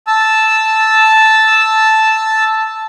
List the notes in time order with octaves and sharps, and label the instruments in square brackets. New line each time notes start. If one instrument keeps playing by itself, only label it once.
[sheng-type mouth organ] A5 E6